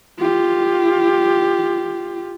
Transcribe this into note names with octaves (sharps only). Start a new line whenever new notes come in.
F4 G4